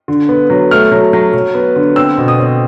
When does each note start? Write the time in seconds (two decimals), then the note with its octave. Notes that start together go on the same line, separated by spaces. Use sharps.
0.08 D3
0.29 B3
0.50 F#3
0.71 A3 F6
0.91 F#3
1.13 F#3
1.34 F#3
1.55 B3
1.76 D3
1.96 C4 E6
2.18 B2
2.28 D#6
2.39 C4